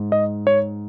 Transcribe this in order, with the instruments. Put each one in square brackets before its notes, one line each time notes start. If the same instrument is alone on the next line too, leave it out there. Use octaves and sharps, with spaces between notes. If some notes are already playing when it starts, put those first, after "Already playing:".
Already playing: [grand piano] G#2
[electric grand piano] D#5
C#5